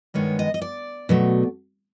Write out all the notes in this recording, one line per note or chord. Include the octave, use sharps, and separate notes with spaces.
G2 D#3 G#3 B3 C#5
D#5
D#5
D5
B2 F#3 A3